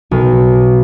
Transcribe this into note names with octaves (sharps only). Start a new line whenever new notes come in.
B1